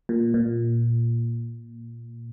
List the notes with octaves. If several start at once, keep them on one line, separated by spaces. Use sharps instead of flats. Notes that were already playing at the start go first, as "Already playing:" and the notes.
A#2
A#2